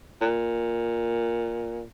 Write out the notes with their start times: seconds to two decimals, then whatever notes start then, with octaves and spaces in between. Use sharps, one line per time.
0.21 A#2